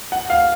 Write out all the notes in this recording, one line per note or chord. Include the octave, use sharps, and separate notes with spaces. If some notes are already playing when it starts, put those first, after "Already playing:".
F#5
F5